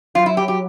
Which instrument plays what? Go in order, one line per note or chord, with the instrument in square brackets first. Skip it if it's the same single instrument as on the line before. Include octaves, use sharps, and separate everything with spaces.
[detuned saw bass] F#3 [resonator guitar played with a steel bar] F4
[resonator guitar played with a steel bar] E4
G4
G4